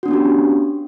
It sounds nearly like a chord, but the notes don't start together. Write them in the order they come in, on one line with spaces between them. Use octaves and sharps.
F#4 D4 B3 C#4 G4